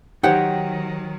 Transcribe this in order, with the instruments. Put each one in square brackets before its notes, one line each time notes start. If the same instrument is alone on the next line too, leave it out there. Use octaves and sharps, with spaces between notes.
[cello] D#3 F#3 [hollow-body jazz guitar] D#4 G4 C#5 [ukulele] C5 F#5 G5